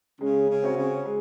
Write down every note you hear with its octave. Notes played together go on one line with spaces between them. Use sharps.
C#3 G#3
C#3
C4 F#4 C#5
C#3
G#3